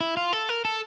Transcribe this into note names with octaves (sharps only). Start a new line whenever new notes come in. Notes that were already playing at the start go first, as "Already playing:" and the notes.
E4
F4
A4
A#4
A4